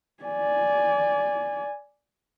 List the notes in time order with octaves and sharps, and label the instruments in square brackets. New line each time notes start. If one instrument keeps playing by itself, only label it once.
[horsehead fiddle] D5 G#5